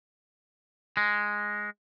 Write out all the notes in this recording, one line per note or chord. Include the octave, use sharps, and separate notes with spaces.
G#3